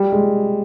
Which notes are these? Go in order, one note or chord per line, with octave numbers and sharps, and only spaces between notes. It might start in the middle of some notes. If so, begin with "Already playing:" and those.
Already playing: G3
G#3